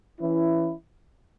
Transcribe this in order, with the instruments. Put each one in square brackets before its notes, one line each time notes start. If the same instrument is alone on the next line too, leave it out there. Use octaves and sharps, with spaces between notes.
[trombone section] E3 C#4 E4